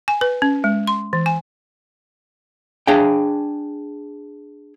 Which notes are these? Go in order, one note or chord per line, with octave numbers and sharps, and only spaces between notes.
G#5
B4
C#4
G#3
C6
E3
G#5
D4 G#4 F5 G5